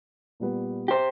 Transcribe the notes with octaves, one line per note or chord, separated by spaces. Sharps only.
A#2 G3 B3
G4 C5